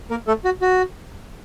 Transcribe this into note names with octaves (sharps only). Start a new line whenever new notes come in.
A#3 A#4
A3 A4
F#4
F#4